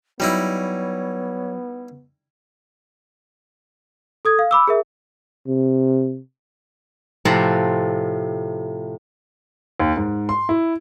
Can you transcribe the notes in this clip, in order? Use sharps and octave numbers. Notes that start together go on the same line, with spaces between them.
F#3 G3 B3 D#4 E4 C#5
A4 D#6 G#6
F5
B5 D6 E6
G#4 A#4 E5
C3
A2 C3 F3 D5 F#5 A#5
D#2
G#2
C6
E4